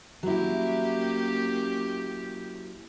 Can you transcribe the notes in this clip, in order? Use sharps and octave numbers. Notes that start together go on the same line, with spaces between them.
F#3 A#3 C#4 E4 G4